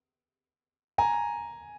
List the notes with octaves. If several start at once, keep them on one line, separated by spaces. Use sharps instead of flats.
G#5 A#5